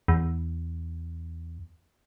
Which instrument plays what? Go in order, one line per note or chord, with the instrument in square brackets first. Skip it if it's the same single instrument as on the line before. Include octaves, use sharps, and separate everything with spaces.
[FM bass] E2